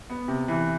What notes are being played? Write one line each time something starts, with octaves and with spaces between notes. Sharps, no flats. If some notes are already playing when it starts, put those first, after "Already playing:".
B3
C3
E3